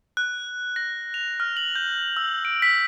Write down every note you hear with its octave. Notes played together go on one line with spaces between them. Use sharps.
F#6
A#6
F7
F6
F#7
G6
E6
D7
B6